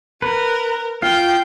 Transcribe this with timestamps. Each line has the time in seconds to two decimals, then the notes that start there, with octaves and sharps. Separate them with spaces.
0.22 A#4 B4
1.02 F4 F5 G5 G6